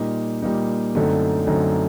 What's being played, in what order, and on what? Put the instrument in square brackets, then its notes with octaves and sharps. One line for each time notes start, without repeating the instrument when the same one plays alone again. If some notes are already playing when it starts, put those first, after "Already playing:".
Already playing: [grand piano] A#2 G3 A#3 D#4
A#2 G3 A#3 D#4
F#2 D3 A3 C4 D#4
F#2 D3 A3 C4 D#4